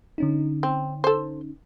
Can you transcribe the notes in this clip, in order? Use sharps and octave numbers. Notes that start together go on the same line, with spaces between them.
D3 C#4 D#4
C4
A4 C5